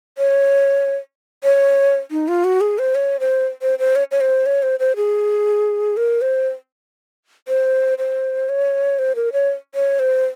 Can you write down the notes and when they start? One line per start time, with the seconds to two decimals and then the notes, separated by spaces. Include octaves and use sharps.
0.18 C#5
1.44 C#5
2.11 D#4
2.28 F4
2.44 F#4
2.61 G#4
2.78 C5
2.95 C#5
3.20 C5
3.62 C5
3.79 C5
3.96 C#5
4.11 C#5
4.21 C5
4.46 C#5
4.63 C5
4.80 C5
4.96 G#4
5.97 A#4
6.22 C5
7.48 C5
7.98 C5
8.49 C#5
8.99 C5
9.15 A#4
9.33 C#5
9.75 C#5
9.99 C5